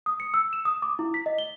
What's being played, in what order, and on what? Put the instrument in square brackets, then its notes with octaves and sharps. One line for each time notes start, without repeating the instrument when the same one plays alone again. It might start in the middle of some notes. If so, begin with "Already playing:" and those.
[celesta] D#6
C#7
E6
E7
D#6
D6
E4
B6
D#5
G7